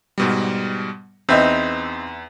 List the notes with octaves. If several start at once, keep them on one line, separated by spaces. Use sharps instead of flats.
G#2 B2 G3
E2 C4 D#4 B4 E5